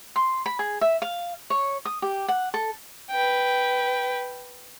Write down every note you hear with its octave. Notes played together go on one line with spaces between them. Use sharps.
C6
B5
G#4
E5
F5
C#5
D#6
G4
F#5
A4
B4 G5